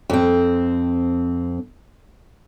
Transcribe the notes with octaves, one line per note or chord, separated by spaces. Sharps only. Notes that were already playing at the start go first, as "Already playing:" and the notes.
F2 C4